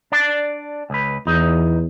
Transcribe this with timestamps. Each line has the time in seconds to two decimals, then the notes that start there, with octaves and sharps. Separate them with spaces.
0.12 D4 D5
0.90 C#2 B4
1.27 E2 D#4